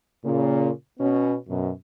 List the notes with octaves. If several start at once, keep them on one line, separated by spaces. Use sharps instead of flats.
A#2 C#3
B2 B3 C#4
F#2 B2